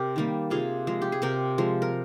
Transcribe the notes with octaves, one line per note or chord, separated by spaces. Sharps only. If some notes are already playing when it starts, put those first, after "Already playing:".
Already playing: C3 G4 A#4
D#3 G3 A#3
C3 F4 G#4
F3 G#3
G4
G#4
C3 G4 A#4
F3 G#3
A#4